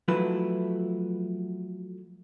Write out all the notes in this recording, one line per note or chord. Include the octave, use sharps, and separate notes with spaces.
F3 F#3 A3 E4 B4